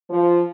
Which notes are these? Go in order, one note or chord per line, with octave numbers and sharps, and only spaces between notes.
F3